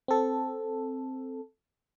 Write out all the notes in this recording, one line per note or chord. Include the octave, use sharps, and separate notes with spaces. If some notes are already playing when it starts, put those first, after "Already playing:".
C4 A4